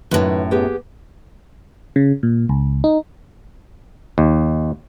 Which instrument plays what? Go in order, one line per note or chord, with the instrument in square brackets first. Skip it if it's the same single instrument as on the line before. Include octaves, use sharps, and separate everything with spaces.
[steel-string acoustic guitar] F#2 A2 [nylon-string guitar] D#3 B4 A5
[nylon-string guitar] B3 G4 G#4
[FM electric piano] C#3
A#2
C#2
D#4
[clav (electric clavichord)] D#2